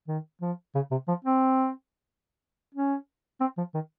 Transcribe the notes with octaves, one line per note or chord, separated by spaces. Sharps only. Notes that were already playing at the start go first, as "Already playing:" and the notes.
D#3
F3
C#3
C3
F3
C4
C#4
C4
F3
D#3